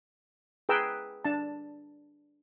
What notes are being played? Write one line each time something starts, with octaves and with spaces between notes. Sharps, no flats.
G#4 B4 G5 A#5 E6
D4 A5